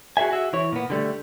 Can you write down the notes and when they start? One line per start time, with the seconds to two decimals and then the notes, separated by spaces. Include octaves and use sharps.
0.17 F#4 G#4 B4 E5 G#5
0.31 F#4 G#4 E5
0.53 E3 E4 C#5
0.72 A#2 B3
0.90 D3 G3 A3